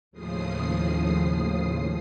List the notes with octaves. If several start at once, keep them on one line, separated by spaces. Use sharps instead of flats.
D#2 A2 C#3 F3 D#6 C7